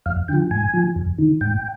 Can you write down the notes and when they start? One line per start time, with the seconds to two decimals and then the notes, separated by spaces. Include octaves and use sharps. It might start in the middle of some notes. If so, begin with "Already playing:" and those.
0.06 F2 F5
0.28 D3 F3 G5
0.51 G#2 G#5
0.74 F3
0.96 F2
1.19 D#3
1.41 G#2 G5